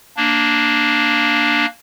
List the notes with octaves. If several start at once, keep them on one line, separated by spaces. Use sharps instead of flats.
A#3 D4